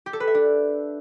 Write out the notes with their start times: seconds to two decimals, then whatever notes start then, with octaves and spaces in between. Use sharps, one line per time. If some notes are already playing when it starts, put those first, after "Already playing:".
0.06 G4
0.13 A4
0.20 B4
0.27 E5
0.34 D4